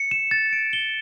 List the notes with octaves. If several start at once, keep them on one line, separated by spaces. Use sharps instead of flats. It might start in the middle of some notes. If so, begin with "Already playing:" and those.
Already playing: C#7
E7
A6
D7
G7